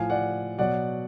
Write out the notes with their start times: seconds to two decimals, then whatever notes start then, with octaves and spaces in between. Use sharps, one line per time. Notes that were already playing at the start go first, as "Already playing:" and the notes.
Already playing: A2 F3 F5 G#5
0.10 D5 F#5
0.59 B2 F#3 D5 F#5